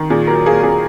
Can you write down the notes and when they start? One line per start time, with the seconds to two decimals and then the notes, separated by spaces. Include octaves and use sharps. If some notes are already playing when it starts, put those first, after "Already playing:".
Already playing: D#3
0.10 A#2 G#4
0.27 F#3 A#4
0.46 A#3 G#4
0.63 A#2 G#4